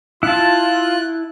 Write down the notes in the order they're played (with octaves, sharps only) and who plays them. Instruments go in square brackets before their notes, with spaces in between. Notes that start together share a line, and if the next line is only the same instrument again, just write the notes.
[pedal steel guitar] E4 A5 [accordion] F4 [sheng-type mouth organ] F#6